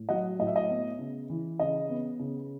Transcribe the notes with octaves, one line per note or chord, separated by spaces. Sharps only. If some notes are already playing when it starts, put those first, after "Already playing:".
Already playing: A2
F#3 D#5 F#5
A2 D#5
E5
D#5
B3
C#3
E3
C#3 D#5
B3
C#3